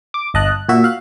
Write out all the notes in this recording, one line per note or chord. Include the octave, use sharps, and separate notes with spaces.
D6
G1 D#5 A5 F#6
F#6
A#2 F#4 E5
F5 F#6